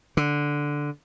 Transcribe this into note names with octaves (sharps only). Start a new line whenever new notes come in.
D3